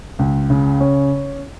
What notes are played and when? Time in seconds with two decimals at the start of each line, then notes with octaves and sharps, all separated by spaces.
0.19 C#2
0.50 C#3
0.80 C#4